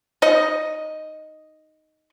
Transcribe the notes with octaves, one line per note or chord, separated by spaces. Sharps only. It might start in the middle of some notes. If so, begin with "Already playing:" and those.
D#4 D#5